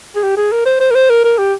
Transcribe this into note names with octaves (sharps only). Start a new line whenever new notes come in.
G#4
G4
G#4
A#4
C5
C5
A#4
C5
A#4
A#4
G4